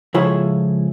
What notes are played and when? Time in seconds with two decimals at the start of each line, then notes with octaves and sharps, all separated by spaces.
0.14 C#2 F3 E4 G#4 A4 C#5